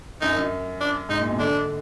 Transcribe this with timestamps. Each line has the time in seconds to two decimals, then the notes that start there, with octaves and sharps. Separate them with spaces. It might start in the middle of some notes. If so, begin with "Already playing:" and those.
0.22 F#2 D#4
0.37 F#2
0.81 D4
1.09 G#2 D#4
1.20 A#2
1.30 B2
1.39 D3 D4